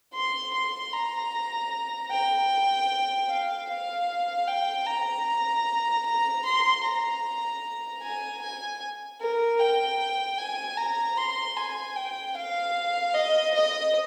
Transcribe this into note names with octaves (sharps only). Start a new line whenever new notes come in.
C6
C6
A#5
G5
F5
F5
G5
A#5
A#5
C6
A#5
G#5
G#5
A#4
G5
G#5
A#5
C6
G#5
G5
F5
D#5
D#5